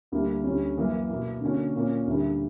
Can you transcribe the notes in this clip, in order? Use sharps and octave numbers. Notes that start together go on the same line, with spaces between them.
D2 D3 G3 A#3 E4
D2 D3 G3 C#4
F#2 E3 A#3
B2 A#3 E4
D3 A#3 C#4 F#4
A#2 A#3 C#4
D2 D3 G3 A#3 E4